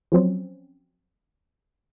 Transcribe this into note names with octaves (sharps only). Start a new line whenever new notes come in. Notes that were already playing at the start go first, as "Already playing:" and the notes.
F3 F#3 C4 C#4